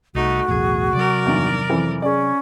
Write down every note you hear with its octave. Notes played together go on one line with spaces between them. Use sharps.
C2 A3 D#4 F#4
B1 E2 A2 G#4
C3 F#3 A#4 D5
E2 G2 D#3
F2 E3
C#4 G#4 D5